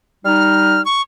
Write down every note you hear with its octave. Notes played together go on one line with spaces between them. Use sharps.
G3 D#4 F6
C#6